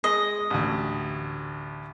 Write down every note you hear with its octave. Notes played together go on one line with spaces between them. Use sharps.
G#3 D#5
A1 D2